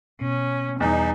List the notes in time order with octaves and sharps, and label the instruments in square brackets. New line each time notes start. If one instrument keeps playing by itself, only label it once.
[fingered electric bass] B2 [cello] C#4
[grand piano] E2 [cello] G3 [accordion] D#4